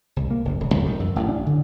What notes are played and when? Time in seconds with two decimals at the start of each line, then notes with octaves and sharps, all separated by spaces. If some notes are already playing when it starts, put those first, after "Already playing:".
0.16 C2
0.31 A#3
0.45 F#1
0.60 D#1
0.74 A#1
0.86 D#3
1.00 F#2
1.16 A1
1.29 D4
1.46 D3